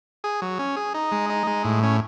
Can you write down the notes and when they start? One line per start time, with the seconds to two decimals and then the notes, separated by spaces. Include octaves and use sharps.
0.24 G#4
0.42 F#3
0.59 C#4
0.76 G#4
0.94 D#4
1.12 G#3
1.30 D#4
1.47 G#3
1.65 A2
1.83 C#4